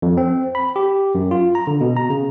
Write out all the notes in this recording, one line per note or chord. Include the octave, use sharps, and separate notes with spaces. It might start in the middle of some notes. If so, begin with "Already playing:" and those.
F2
C4
B5
G4
F#2
F4
A#5
D3
B2
A#5
C#3